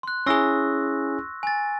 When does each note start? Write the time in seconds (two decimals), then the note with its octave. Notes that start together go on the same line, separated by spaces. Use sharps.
0.03 C6 F#6
0.26 C#4 E4 G#4 C#6 E6 A#6
1.43 G#5 A6